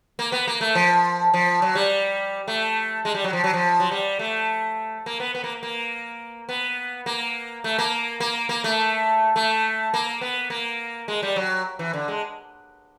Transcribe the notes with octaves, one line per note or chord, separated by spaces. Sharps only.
A#3
B3
A#3
A3
F3
F3
F#3
G3
A3
G#3
G3
F#3
F3
F#3
F3
F#3
G3
A3
A#3
B3
B3
A#3
A#3
B3
A#3
A3
A#3
A#3
A#3
A3
A3
A#3
B3
A#3
G#3
G3
F#3
E3
D3
G#3